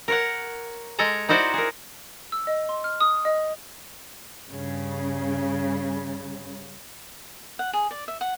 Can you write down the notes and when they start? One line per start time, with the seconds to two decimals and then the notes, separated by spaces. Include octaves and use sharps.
0.08 A#4 C#5 F#5
0.99 G#3 A4 G#5 A#5
1.29 D#4 E4 F#4 C5 D5
1.54 G#4 A#4
2.32 E6
2.47 D#5
2.69 C6
2.84 F6
3.01 D#6
3.25 D#5
4.49 G2 C#3
7.59 F#5
7.73 G#4
7.91 D5
8.08 E5
8.21 F#5